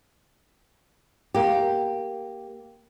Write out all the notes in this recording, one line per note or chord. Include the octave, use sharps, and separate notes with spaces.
A#3 G4